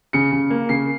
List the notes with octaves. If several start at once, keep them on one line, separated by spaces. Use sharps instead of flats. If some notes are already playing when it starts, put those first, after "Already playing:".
C#3 C#7
C#3
A#3
C#3 C7